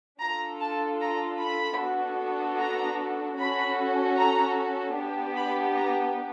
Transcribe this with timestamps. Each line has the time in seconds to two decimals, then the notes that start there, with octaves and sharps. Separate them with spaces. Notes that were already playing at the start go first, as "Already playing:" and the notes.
0.20 D4 F4 A4 A#5
0.61 A5
1.00 A#5
1.40 B5
1.79 B3 D4 F#4 A4
2.59 A#5
3.37 C#4 F#4 A4 B5
4.17 A#5
4.97 B3 D4 G4
5.36 B5
5.76 A#5